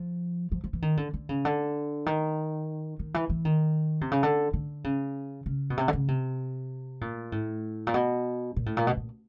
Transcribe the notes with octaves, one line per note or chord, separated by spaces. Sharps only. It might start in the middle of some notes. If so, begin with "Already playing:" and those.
Already playing: F3
F3
F3
E3
D#3
D3
D3
C#3
D3
D#3
D#3
E3
E3
D#3
C3
C#3
D3
D3
C#3
C#3
B2
C3
D3
C#3
C3
A#2
A2
A#2
B2
A#2
A2
A#2
B2
A#2